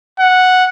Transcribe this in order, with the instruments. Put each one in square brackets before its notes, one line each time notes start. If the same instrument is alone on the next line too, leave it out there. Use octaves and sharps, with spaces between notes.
[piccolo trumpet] F#5